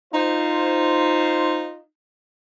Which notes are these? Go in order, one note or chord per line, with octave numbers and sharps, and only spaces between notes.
D#4 F4 C5